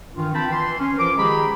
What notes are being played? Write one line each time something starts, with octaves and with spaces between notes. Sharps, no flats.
G2 D#3 E3 F4
C4 F4 G5 A5 B5
E3 C6
C#4
E3 F3 F4 A#4 D6
D#3 G#3 G4 G#4 A#5 B5